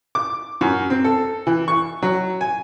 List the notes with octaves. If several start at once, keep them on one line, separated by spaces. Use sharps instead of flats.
D6
F#2
C4
A4
E3
C#6
F#3
G#5